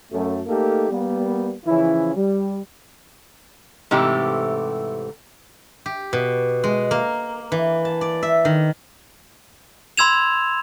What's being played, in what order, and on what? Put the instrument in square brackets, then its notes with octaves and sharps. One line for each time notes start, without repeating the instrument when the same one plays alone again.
[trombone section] F#2 A3
A3 A#3 D#4 G4 A4 A#4
G3 A#3 B3
C#3 E3 F3 C#4 E4
G3
[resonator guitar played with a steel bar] G#2 C3 E3 A3 G4
[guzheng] G4
B2
G#3
A#3
E3
A5
D5
E5
D#3
[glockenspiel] B5 C6 E6 G#6 E7 F7